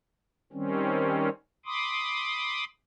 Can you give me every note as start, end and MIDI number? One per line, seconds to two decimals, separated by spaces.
0.53 1.29 51
0.53 1.29 55
0.53 1.29 60
0.53 1.29 61
1.66 2.64 83
1.66 2.64 84
1.66 2.64 86
1.66 2.64 87